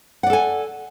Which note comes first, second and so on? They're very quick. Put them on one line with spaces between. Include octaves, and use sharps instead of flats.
F#5 D5 A4 G#5